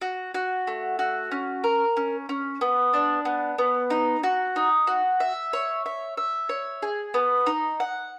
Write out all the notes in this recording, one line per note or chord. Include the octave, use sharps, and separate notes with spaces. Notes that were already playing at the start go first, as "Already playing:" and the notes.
F#4
F#4
A3
F#4
C#4
A#4
C#4
C#4
B3
D4
B3
B3
D#4
F#4
D#4
F#4
E5
C#5
E5
E5
C#5
G#4
B3
D#4
F#5